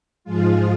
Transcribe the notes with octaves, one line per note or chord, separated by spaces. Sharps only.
G#2 F3 G#3 F4